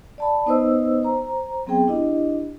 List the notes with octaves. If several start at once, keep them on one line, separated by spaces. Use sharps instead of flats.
D5 A5 B5
B3 D#4 B4 C5 D#5 E6
C5 A#5
F#3 B3 C4 G#4 G5
D4 E4 G4 D#5